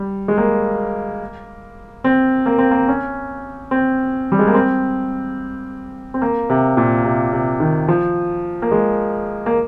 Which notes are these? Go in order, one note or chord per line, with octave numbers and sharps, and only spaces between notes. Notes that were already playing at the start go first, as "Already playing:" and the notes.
Already playing: G3
G#3
A#3
C4
A#3
C4
A#3
C#4
C4
G3
G#3
A#3
C4
C4
A#3
C3
A#2
C3
C3
D#3
F3
A#3
G#3
A#3